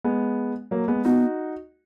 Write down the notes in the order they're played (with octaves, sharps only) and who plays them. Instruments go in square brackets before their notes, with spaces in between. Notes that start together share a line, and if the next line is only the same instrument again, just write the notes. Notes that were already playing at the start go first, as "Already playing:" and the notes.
[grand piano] G#3 B3
F#3 A#3
G#3 B3
[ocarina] B3 [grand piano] D#4 F#4